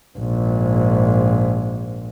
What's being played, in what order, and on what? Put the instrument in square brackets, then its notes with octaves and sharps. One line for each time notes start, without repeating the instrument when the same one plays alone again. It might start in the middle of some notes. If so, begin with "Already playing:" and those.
[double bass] A#1 G#2